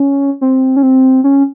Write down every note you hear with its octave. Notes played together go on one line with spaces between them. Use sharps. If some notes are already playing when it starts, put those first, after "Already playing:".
Already playing: C#4
C4
C#4
C4
C#4